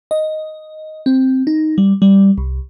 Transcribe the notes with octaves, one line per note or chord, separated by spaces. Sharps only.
D#5
C4
D#4
G3
G3
C2